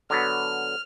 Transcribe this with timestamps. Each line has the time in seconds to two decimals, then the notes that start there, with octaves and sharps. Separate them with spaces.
0.10 D3 F#3 B3 F6